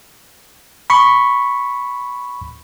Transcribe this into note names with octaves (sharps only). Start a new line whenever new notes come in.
B5 C#6